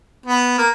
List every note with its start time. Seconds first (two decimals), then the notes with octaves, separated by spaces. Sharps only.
0.26 B3
0.58 A#3